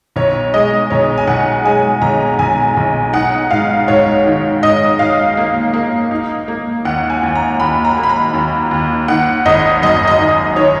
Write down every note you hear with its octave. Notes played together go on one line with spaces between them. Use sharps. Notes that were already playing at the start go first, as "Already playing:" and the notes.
B1 C#5
G#3 D#5
B1 C#5
G#5
B1 F#5
G#3 G#5
B1 A#5
B1 G#5
B1
D#4 F#5
G#2 F5
G#2 C#5
D#3
G#2 D#5
G#2 F5
A#3
A#3
D#4
A#3
D#2 F#5
G#5
D#2
A#5
D#2 B5
A#5
A#3
B5
A#5
D#2
D#2
D#3 F#5
G#1 D#5
F#2 D#5
D#5
D#3
D#3 C#5